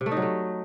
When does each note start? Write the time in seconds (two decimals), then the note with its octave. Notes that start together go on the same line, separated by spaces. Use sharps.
0.01 C3
0.06 A3
0.11 D#4
0.17 F#3
0.22 A3